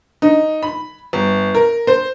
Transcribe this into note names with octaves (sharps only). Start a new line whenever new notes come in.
D#4
B5
G1
A#4
C5